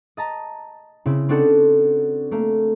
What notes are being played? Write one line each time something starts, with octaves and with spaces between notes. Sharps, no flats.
D#5 A5 A#5
C#3 C4 E4
C4 D4 D#4 F#4 A4
A3 A#3